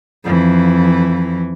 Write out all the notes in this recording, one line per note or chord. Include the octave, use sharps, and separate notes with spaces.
F2 E3